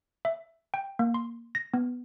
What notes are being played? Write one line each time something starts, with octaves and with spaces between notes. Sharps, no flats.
E5
G5
A#3
C6
A#6
B3